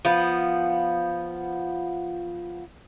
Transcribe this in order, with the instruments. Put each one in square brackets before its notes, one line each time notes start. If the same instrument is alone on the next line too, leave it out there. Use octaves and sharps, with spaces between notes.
[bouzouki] F3 B3